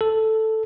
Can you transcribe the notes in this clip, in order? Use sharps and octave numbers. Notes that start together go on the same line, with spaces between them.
A4